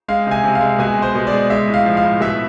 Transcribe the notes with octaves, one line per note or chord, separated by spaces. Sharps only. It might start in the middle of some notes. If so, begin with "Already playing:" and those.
G#3 F5
C3 G#5
C3
F5
G#3
B2 G#5
G#3 C5
B2
D5
G#3
G#3 E5
A2
F5
F3
F5
A2
B2 E5